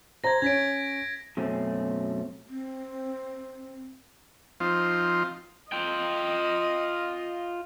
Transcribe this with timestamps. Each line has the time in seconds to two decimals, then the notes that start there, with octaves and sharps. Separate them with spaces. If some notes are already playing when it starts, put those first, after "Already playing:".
0.24 C5 A#5 G#6 A#6
0.42 C#4 C#5 G#6 B6 D7
1.37 F#2 B2 A3 C4 C#4
2.49 C4
4.60 F3 C4 D#4 F4
5.72 F4 D#5 G5